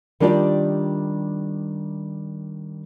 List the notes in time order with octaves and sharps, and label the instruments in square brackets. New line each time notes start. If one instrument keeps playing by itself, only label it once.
[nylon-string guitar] D#3 G3 D4 F4 G4 D5